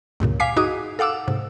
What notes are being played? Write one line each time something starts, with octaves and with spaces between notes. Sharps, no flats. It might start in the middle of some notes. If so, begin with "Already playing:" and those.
C#2 G2 A#2 C#3
F5 G#5 D6 B6 C7
D#4 F#4 G#4 D#5 D6 D#6
A4 F5 F#5 D6 E6
G#2 C3